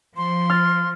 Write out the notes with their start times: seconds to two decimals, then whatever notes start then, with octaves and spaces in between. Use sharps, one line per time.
0.17 F3 C6
0.50 F6 A6